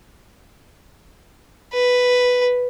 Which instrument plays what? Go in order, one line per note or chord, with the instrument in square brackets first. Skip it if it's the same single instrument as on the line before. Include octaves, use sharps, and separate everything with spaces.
[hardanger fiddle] B4